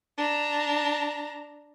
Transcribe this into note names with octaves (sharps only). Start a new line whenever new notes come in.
D4 A#5